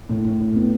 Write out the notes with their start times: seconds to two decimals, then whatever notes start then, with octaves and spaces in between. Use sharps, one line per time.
0.09 A2
0.25 A2
0.40 A2
0.56 B3